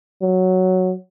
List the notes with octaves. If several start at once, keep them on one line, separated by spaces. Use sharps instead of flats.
F#3